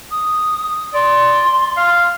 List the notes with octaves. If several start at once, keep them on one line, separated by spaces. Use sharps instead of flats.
D#6
D5 C6
F5